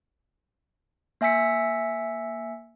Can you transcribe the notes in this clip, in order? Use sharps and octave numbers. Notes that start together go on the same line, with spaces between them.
A#3 E5 G#5 E6 B6 C#7